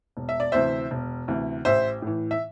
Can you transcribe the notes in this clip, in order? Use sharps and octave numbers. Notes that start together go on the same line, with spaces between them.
E1
E5
D5
D2 C3 E3 C5 E5
E1
D2 C3 E3
A1 C5 E5
A2 E3
E5